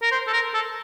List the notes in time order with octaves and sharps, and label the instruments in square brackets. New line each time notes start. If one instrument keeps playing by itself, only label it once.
[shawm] A#4
C5
A4
A#4
A4